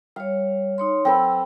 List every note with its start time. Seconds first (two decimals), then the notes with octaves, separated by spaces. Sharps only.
0.16 G3 C#5 F5
0.78 D#4 C#5 C6
1.05 F#3 C4 A4 B4